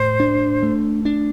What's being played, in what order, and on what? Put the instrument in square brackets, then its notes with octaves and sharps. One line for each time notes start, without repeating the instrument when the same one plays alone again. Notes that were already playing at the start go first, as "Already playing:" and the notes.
Already playing: [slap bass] A2 [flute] C5
[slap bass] D4
A3
D4